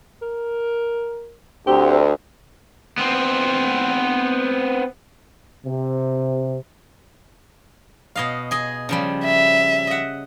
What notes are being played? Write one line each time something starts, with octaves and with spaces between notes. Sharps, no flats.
A#4
D2 C4 G4
B3 C4
C3
B2 D#5 F5
G#4 D#5
C#3 F3 G3
E5
D#5 F#5